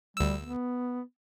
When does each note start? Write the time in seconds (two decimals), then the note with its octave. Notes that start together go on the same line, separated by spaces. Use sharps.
0.17 D2 G3 E6
0.43 B3